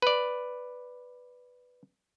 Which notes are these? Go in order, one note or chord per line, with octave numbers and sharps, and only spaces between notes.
B4 D5